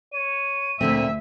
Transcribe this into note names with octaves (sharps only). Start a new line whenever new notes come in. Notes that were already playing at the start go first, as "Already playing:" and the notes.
C#5 D#7
D2 A#2 D3 C4 E5